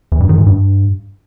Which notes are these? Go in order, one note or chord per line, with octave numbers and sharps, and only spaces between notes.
E2
G2
D#3
G#2
G2